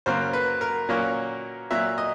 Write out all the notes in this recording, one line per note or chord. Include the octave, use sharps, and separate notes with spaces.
F#2 C#3 F#3 A#3 C5
B4
A#4
A#2 F#3 A#3 C#4
A#2 F#3 A#3 E5
D#5